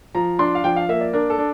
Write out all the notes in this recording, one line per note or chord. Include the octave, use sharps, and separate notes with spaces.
F3 A#5
D4 C6
F5
F3 G5
F5
A#3 E5
D5
D4 A#4
A4
D4